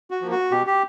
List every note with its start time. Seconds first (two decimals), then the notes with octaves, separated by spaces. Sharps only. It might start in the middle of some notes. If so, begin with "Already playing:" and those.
0.10 F#4
0.21 F3 A#3
0.31 F#4
0.51 B2 G4
0.67 G4